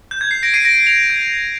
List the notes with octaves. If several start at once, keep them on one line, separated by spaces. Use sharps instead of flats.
G6
G#6
C7
A#6 D7
C7 D#7
A#6 D7
D7 F7
G#6